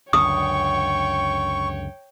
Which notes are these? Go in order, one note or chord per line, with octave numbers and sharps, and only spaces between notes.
C#2 F#2 D3 C#5 G5 C#6 D#6